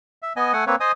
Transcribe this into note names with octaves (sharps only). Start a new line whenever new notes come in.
E5
B3 D#5 G#5
A3 F#5 G#5
A#3 C4 B4 C#5
C5 D#5 G#5 D#6